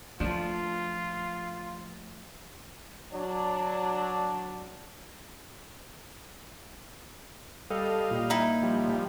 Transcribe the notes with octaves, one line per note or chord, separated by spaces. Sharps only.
F3 A3 D4 F4
F#3 D4
G3 A4 D#5 F5
A#2
D#4 E4
F3 G3
F3 G3